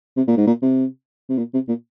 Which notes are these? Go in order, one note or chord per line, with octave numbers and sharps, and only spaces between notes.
C3
A#2
G#2
A#2
C3
C3
A#2
C3
A#2